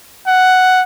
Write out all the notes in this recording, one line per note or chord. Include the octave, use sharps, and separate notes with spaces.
F#5